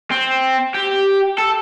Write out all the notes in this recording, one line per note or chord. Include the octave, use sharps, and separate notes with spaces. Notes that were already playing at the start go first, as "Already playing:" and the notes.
C4
G4
A4